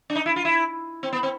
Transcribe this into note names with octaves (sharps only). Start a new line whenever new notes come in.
D4
D#4
E4
F4
E4
C4
B3
C4